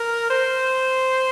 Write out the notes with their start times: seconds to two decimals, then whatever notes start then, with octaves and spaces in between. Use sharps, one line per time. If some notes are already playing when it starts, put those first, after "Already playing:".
Already playing: A#4
0.30 C5